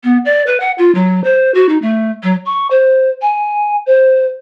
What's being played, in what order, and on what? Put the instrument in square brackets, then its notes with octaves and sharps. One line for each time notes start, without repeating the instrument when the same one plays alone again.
[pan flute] B3
D5
B4
F#5
F4
F#3
C5
F#4
D#4
A3
F#3
C#6
C5
G#5
C5